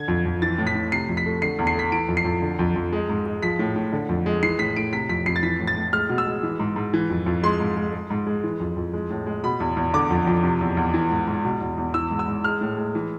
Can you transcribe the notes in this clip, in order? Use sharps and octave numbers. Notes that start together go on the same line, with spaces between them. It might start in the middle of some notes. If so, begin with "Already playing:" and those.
Already playing: D3 G#6
F2
F2
E3 A6
A2
B6
A2
C3 C7
F2
B6
A3
D3 C7
E2
C7
A3 B6
E3 D7
F2
C7
F2
D3
F2
F2
G#3
G#2
G#3
F3 B6
A2
A2
D3
F2
G#3
E3 C7
A2 B6
A2 D7
C3 B6
F2 B6
F2 C7
A6
E3 B6
A2
A6
A2
G#3 F6
B2
E6
G#3
E3
G#2
G#2
E3
F2
F2
G#3 C6
G#2
G#3
G#3
G#2
G#3
E3
F2
F2
G#3
A2
G#3
B2 B5
E2
E2
D3 D6
F2
F2
C3
E2
E2
E3
G#2
G#2
B2
E2
E2
E3 E6
G#2
E6
G#2
G#3 F6
A2
G#3
E3